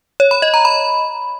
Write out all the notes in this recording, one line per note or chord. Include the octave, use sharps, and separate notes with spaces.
C#5
B5
D#5
A#5
B5